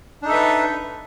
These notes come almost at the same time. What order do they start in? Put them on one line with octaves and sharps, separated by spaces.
D4 D#4 A4 E5 B4